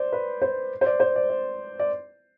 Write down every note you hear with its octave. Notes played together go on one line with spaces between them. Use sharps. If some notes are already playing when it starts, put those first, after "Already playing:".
Already playing: C5 D5
B4
C5
C5
D5
C5
D5
D5
D5